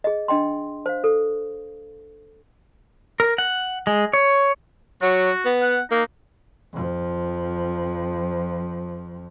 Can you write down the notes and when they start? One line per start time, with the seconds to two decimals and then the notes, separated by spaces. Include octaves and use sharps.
0.04 G#4 D#5
0.28 D4 D#5 G5 C6
0.86 C5 F5
1.04 A4
3.20 A#4
3.38 F#5
3.87 G#3
4.13 C#5
5.02 F#3 F#4
5.45 B3
5.62 F#5
5.91 A#3 D#4
6.73 F2 F3